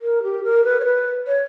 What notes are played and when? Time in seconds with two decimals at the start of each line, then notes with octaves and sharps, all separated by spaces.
0.01 A#4
0.23 G4
0.44 A#4
0.64 B4
0.80 C#5
0.85 B4
1.27 C#5